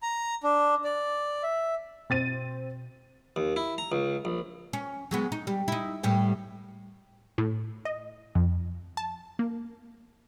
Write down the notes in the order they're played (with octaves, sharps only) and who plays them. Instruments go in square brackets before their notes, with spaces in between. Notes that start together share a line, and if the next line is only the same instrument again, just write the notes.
[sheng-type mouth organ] A#5
D4
D5
E5
[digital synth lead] B2 [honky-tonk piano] C4 A6 D#7
[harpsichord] D#2
E4
A#5
C#2
A#1
[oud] C#4
F#3 G#3 B3
D#4
G3
D#4 E4
A2 G3 B3
[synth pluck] A2
D#5
F2
A5
A#3